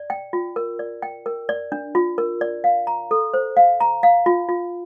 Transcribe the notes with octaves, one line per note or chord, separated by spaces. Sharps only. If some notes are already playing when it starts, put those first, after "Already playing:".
Already playing: D5
G5
F4
A#4
D5
G5
A#4
D5
D4
F4
A#4
D5
F5
A#5
A4
C5
F5
A#5
F5
F4
F4